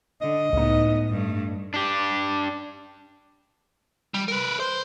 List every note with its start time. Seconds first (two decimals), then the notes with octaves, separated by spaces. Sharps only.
0.21 D3 D#5
0.53 C#2 A2 B3 D#4
1.09 G2 A3
1.74 D4 G4
4.14 G3
4.28 A#4 B4
4.60 C5